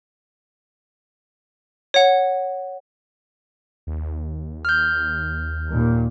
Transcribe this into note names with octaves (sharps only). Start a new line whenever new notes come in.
C#5 F#5
D#2
F6 G6
D#2 A#2